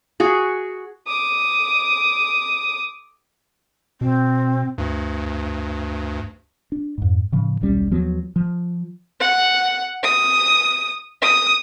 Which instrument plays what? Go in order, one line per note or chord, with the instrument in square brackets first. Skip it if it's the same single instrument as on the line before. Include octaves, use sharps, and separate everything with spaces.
[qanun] F#4 G#4
[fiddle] D6 D#6
[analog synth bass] B2 [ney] C4
[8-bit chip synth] D2 G2
[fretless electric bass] D4
F2 G#2
A2 C#3 F3
D#1 B1 G3 C#4
D#2 F3 F#3 B3
F3
[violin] F#5
D#6
D#6